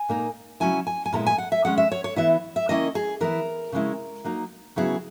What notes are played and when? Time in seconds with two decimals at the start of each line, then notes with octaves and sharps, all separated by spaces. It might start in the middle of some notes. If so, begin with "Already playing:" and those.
Already playing: G#5
0.09 A#2 A#3 D#4
0.60 C#3 F#3 C#4 E4 G#5
0.87 G#5
1.06 G#5
1.13 A#2 G#3 B3 E4 A#5
1.27 G#5
1.38 F#5
1.52 E5
1.65 D#3 G#3 C#4 F#5
1.78 E5
1.92 C#5
2.04 C#5
2.16 E3 B3 E4 E5
2.56 E5
2.69 D#3 A#3 C#4 E4 D#5
2.95 G#4
3.21 E3 B3 E4 A#4
3.72 C#3 G#3 C#4 E4
4.24 F#3 A#3 D#4
4.76 C#3 F#3 B3 E4 G#4